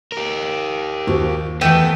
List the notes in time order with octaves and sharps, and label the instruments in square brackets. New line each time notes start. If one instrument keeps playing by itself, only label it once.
[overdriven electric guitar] G4 A#4
[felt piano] D#2 F#4 C5 [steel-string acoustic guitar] F4
[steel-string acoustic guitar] E2 E3 D#5 [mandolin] A3 G5 E6 [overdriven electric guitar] B3